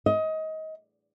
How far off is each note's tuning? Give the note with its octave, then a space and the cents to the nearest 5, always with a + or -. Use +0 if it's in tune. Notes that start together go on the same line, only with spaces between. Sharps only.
D#5 +25